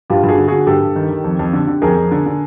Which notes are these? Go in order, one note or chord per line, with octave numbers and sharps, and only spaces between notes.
G2 F4 G4
G2
F#4 G#4
D3
D3 F#4 G#4
G2 G4 A4
G2
D#3
D#3
F2
F2
D3
D3
F2 G#4 A#4
F2
D3
D3